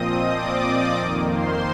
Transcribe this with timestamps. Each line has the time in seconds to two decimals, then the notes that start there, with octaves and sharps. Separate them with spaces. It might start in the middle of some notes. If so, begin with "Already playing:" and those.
Already playing: A#2 F3 C4 D#5 D#6
0.33 D5 D6
0.98 F2 D#3 A#3
1.29 C5 C6